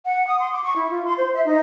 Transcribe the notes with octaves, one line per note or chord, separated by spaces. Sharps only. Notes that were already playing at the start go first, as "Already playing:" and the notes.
F#5
D#6
C6
D6
C#6
E4
F4
C6
C5
E5
D#4